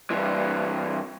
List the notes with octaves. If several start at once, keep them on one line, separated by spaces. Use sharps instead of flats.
G2 E3